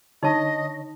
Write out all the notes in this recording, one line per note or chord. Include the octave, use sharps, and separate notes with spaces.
D3 D#4 C#5 D#5 A5